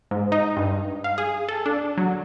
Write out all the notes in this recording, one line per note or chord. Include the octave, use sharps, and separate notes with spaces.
G#2
D#4
G2
F5
G#4
A4
D4
F#3